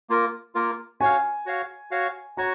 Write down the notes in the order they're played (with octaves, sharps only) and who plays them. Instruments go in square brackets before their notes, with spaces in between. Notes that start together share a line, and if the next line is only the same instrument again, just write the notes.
[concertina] A#3 F4 A#4
A#3 F4 A#4
[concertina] F#4 C#5 F5 [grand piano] G#5
[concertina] F#4 C#5 F5
F#4 C#5 F5
[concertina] F#4 C#5 [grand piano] A#5